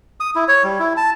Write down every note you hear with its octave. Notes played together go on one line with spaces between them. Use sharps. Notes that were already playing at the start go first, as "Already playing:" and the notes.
D#6
E4
C#5
G3
E4
A5